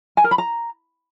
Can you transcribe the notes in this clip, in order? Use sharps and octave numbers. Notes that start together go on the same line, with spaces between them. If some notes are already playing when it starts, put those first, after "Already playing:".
G#5
A#4
B5
A#5